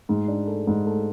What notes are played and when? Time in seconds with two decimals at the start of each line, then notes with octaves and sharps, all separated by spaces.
0.09 G#2
0.28 D4
0.47 A3
0.67 G#2
0.86 A3